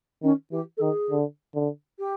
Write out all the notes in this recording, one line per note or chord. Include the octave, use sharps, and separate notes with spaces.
D#3 C#4
E3 G4
A4
D#3 G#4
D3
D3
G4